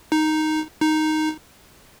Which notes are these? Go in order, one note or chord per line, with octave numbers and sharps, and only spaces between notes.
D#4
D#4